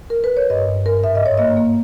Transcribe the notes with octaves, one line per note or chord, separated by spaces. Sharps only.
A#4
B4
C#5
G2 D#5
G2
G2 A#4
G#2 E5
D#5
G#2 C#5
A#3 D#5
A#3